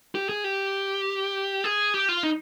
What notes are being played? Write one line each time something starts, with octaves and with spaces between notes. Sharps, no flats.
G4
G#4
G4
G#4
G4
F4
D#4